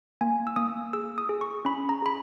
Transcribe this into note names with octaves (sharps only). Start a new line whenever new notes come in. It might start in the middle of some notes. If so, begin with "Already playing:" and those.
A#3 G#5
E6
A#3 D#6
G#4 E6
D#6
G#4
C#6
C#4 B5
A#5
G#4 B5